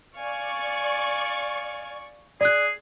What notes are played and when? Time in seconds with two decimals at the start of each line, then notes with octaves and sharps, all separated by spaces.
0.17 D5 F5 G#5 C#6
2.41 G#4 D5 F#6